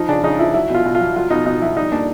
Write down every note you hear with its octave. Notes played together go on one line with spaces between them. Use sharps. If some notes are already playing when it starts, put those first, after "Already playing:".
Already playing: F3 D#4
C#3 D4
C#3 D#4
F3 E4
F#3 E4
B2 F4
B2
F4
F#3
F#3 F4
B2 D#4
B2 D#4
F#3 E4
G3 D#4
A#2 D4